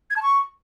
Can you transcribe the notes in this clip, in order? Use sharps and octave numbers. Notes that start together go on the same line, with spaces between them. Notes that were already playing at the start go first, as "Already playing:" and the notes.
G#6
A5
C#6